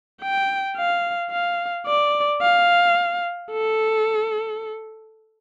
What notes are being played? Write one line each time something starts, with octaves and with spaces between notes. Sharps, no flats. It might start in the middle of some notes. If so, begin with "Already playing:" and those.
G5
F5
F5
D5
F5
A4